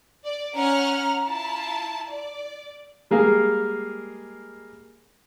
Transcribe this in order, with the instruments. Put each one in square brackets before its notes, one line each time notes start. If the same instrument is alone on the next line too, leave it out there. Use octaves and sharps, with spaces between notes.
[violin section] D5
[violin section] C#4 F#5 F6 [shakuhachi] A#5
[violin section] E4 F4 A5
D5
[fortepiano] G3 G#3 A#3 G#4 A#4 F5